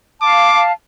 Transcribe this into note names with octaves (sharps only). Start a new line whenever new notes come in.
F5 A5 D6